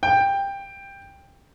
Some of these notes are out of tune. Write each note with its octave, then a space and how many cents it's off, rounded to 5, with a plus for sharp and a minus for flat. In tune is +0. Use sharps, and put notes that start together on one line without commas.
G5 +15